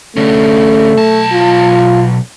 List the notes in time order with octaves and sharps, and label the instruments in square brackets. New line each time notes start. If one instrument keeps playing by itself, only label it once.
[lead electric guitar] D3 C#4 [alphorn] A3
[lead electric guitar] B1 A5
[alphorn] F4